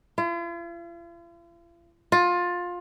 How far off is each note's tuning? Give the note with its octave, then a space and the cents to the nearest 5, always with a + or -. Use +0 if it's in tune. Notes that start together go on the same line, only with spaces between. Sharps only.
F4 -45
F4 +20